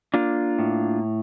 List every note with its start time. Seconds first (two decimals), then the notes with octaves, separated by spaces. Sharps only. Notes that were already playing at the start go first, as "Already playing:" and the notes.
0.14 A#3 D4 F4
0.59 A2